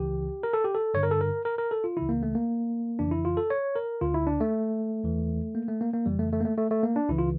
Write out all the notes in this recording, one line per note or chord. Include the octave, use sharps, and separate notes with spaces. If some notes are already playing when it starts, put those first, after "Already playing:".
Already playing: C#2 C#3 E3 G4
A#4
A4
G4
A4
G2 D3 C#5
A#4
A4
A#4
A#4
A#4
A4
F4
C#2 C#3 E3 E4
A#3
A3
A#3
F2 C#3 E3 D4
E4
F4
A4
C#5
A#4
D2 D3 F4
E4
D4
A3
E2 E3
A#3
A3
A#3
A#3
F2 C#3 E3 G3
A3
A3
A#3
A3
A3
A3
A#3
D4
C#2 C#3 E3 E4
F4